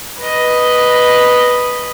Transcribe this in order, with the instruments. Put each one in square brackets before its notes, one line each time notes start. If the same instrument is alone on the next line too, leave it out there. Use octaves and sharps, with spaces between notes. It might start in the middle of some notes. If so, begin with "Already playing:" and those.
[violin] B4 D#5